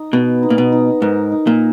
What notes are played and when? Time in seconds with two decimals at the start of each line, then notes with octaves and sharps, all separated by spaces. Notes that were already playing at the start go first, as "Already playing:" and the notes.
Already playing: D#4
0.13 B2 B3
0.43 D#4
0.50 A#2
0.58 B2
0.72 D#4
1.02 G#2 A#4
1.32 D#4
1.47 A#2